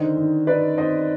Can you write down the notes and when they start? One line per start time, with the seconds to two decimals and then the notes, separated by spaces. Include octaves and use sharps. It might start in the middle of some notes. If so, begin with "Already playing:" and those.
Already playing: D3 D#3 C5 D#5
0.17 D#3
0.47 D#4 B4 D5
0.77 C4 C5 D#5